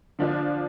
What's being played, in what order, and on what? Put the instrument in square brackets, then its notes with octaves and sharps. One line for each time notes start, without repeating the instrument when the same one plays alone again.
[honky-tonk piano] D3 F3 D4